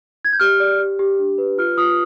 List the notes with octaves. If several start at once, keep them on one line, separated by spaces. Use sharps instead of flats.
G#6
G6
G4 F6
D5
G4
G4
D4
B4
F4 F6
F4 D#6